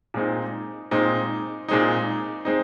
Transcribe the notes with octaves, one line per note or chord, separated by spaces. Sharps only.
A#2 G#3 C4 D#4
A#2 G#3 C4 D#4
A#2 G#3 C4 D#4
G#3 C4 D#4